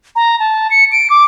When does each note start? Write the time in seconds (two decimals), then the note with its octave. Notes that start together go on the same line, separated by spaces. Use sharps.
0.16 A#5
0.40 A5
0.71 C#7
0.92 D7
1.10 D6